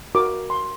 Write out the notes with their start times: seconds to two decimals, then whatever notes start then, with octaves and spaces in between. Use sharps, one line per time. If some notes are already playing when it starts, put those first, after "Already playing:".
0.15 F#4 A#4 D6
0.50 C6